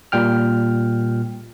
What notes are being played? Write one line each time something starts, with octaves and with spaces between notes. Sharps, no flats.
A#2 G3 G5 F6